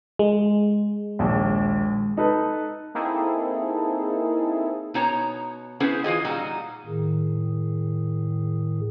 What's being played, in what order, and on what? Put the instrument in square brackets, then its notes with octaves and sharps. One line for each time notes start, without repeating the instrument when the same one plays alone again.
[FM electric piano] G#3
[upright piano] A#1 D#2
D#4 A4 B4
[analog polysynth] A#3 C4 D#4 E4 G#4 A4
[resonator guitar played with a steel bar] B2 D#4 C#5 A5 A#5
B3 C#4 E4 G#4 C5
E3 F4 G#4 D#5
A#2 G3 D#4 F#4
[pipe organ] A2 D#3 G#4